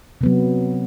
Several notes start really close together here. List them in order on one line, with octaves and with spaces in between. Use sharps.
C3 B3 F#3